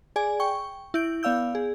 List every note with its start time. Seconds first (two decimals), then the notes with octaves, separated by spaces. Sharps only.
0.16 G#4 D5 G#5
0.40 G5 C#6
0.94 E4 G6 D7
1.23 B3 D5 F5 E6 G6
1.55 G#4